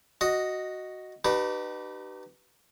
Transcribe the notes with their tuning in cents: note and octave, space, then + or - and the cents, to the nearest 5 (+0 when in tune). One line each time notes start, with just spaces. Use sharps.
F#4 +0 D#5 +0
D#4 -40 G4 -30 B4 +0